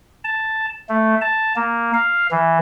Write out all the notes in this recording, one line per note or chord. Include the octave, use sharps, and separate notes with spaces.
A5
A3
A5
A#3
F5
E3